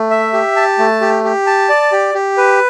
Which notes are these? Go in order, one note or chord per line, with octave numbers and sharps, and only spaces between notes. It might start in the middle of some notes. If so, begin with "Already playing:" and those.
Already playing: A3
E5
G4
A5
A3
G4
G4
A5
D5
G4
G4
B4